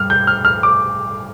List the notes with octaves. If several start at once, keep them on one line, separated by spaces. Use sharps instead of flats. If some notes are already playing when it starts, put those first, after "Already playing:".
Already playing: G2 F6
G6
F6
F6
D6